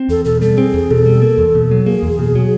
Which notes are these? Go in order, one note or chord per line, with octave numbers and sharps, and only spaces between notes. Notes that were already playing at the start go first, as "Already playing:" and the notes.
Already playing: C4
E2 A4
B2 A4
G3 A4
C4 G#4
E2
B2 A4
G3
A#3
E2
B2
F#3
A#3 G#4
E2
B2
F#3